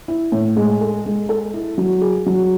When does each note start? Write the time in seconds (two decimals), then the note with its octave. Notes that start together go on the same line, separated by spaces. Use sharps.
0.08 E4
0.32 A2
0.56 G#3
0.81 A4
1.06 G#3
1.29 A4
1.54 E4
1.78 F#3
2.01 G#4
2.26 F#3